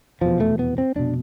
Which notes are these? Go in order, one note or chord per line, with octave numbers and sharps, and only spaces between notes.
F1 E2 B2 F3
A3
B3
C4
F1 B2 D4